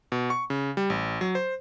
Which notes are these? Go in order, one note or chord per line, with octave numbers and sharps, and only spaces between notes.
B2
C#6
C#3
G3
A1
F#3
C5